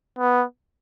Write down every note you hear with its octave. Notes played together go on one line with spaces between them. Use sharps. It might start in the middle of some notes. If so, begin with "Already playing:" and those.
B3